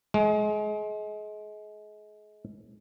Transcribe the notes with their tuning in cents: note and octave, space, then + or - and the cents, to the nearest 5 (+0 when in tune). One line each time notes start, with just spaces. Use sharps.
G#3 +30